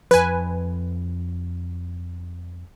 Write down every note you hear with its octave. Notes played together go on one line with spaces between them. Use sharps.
F2 F3 B4 G#5